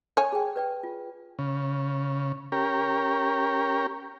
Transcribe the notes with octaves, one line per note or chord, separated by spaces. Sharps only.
C#5 G#5
G#4 G5
B4 D5 G5
F4
C#3
C#4 G4 A#4